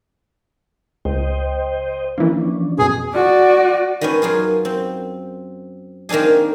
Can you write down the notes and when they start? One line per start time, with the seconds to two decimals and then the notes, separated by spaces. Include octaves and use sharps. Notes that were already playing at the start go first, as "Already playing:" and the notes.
1.05 C#2 C5 D#5 G5
2.18 E3 F3 A#3 C#4 D4
2.79 F#2 B2 G#4
3.14 F#4 D5
4.01 D#3 B3 C#4
4.22 F#2 F4 G#4
4.65 C4
6.09 D#3 A#3 C4 D4 G#4